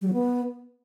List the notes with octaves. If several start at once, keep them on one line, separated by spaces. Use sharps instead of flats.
G3
F#3
B3